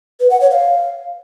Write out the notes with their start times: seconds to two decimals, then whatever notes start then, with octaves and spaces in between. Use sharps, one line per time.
0.20 B4
0.30 F#5
0.41 C#5
0.51 F5